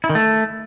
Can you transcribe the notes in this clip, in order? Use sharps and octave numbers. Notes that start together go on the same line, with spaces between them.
E4
D#3
A3